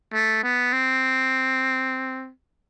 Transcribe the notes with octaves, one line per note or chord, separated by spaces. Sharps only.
A3
B3
C4